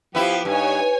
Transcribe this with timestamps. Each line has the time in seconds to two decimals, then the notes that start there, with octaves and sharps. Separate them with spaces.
0.15 F3 B3 E4 G4
0.45 G2 D#4 C#5 G#5